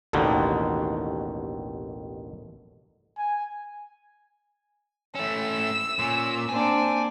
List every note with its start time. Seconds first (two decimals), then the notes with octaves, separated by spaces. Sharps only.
0.13 A1 D#2 B2 D3 D#3
3.18 G#5
5.15 A3 C#4 E6
5.99 A#2 C#4
6.49 A#3 C4 D4 G#5